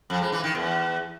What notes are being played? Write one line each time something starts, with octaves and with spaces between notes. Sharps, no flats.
F2
G#3
E3
D#3
E2